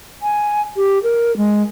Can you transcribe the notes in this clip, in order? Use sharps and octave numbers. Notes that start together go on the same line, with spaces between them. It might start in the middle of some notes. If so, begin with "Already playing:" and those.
G#5
G4
A#4
G#3